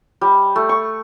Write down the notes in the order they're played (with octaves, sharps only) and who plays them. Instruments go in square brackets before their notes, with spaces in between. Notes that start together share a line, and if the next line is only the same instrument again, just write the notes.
[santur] G3
A3
C#6